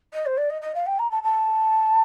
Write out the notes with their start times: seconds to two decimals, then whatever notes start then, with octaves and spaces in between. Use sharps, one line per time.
0.13 D#5
0.26 C5
0.37 D5
0.50 D#5
0.62 D#5
0.74 F5
0.86 G5
0.99 A#5
1.11 A5
1.23 A5